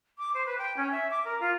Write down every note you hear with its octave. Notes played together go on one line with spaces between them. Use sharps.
D6
C5
B4
G5
C#4
E5
D6
A#4
F4